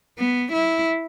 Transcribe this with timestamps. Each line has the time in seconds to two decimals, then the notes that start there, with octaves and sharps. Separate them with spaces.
0.18 B3
0.53 E4